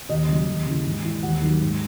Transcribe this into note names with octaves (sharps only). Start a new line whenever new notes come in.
D#2 D#5
C#3 F#3
D#2
C#3 E3
G#2
E3
D#2 F#5
D#3 F#3
G#2